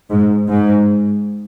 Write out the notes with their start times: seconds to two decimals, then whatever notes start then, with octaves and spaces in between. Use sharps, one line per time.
0.10 G#2
0.48 G#2